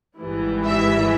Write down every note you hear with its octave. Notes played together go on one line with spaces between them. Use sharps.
G#1 G#2 E3 G3
E5